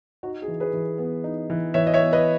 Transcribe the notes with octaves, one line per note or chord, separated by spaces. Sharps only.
D#4 F#4
G#4
E3
G#4 B4
E3
B3
D#4
E3
E3 C#5 E5
D#5
C#5 E5
B3
B4 D#5